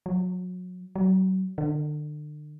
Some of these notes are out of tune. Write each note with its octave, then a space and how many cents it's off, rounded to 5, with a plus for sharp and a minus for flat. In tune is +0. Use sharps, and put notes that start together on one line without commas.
F#3 -30
F#3 +30
D3 +35